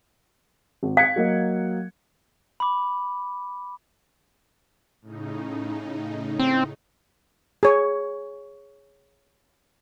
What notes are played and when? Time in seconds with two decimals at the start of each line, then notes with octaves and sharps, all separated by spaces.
0.83 G#1
0.97 F5 F#6 G#6 C#7
1.16 F#3 A#3 D#5
2.60 B5 D6
5.02 A2 C#3 D#4
6.39 C4
7.63 G#4 C#5